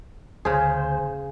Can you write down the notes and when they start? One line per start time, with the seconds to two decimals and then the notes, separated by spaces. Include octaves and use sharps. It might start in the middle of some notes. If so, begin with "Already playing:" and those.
0.45 D2 C#3 G#4 C5